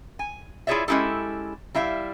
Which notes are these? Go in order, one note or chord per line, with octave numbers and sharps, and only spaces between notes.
G#5
E4 F4 G#4 C#5 D5 E5
G#3 C#4 E4 G4 A4
G3 E4 E5 F5